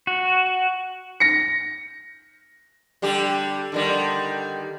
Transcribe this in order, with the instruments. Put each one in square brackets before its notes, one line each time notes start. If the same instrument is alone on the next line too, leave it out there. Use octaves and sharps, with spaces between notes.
[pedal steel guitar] F#4
[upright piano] A#6 C#7
[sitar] D3 G3 G4
D3 D#3 G3